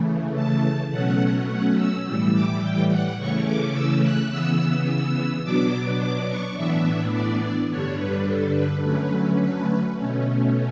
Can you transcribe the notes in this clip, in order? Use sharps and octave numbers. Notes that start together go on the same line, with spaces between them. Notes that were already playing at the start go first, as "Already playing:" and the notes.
Already playing: C#3 E3 A3
A5
B2 F#3 A3 C#4 F#5
F#5
E6
A2 E3 G3 E6
D6
G5
F#5
C#3 E3 A3 C#4 C#6
D6
E6
F#6
C#3 E3 B3 E6
E6
B2 F#3 B3 D4 D6
D6
C#6
A2 E3 B3 D4 E5
D5
G2 D3 G3 D4 C#5
B4
A4
B4
D3 F#3 A3 C#4 B4
B4
B2 A3 C#4